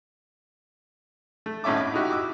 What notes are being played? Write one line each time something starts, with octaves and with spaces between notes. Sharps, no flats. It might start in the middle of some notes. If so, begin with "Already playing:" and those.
A3
G#1 A2 C#4 E5 D6
D6
D#4 E4 F#4 G4
D6 E6